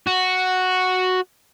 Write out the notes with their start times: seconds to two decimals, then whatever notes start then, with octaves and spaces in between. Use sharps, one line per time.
0.07 F#4